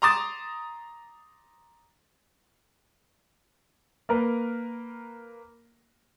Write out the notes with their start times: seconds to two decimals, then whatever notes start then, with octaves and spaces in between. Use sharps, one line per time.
0.02 A#5 C6 D6 D#6 A6 E7
4.09 A#3 A#4 B4